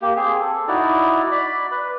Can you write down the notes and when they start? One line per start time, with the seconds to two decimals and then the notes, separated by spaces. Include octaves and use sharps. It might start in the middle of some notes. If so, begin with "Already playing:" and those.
0.02 A#3 G4
0.16 C4 G#4
0.41 A4
0.68 D#4 E4 F#4 D5
1.31 D5 B5
1.71 B4